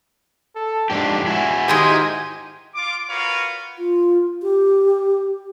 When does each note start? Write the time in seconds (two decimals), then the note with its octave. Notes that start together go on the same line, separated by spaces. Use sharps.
0.56 A4
0.90 F2 G#2 D4 G4
1.26 E4 F#4 G#5
1.68 G#2 D#3 G#3 G4 G#4 D#5
2.75 F4 D6
3.10 F4 F#4 A#4 B4 C#5 F5
3.79 F4
4.42 G4